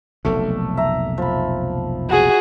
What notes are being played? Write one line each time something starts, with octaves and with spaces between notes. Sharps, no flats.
F1 B1 A#2 A3
E5 A#5
F3 B5
F#4 G#4